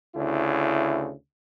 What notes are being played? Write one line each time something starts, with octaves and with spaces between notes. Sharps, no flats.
D2 C#3 E4